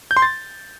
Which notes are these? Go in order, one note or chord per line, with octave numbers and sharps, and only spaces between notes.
G6
C6
A6